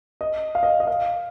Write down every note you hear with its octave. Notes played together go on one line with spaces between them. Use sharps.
D#5
F5
D#5
D#5
F5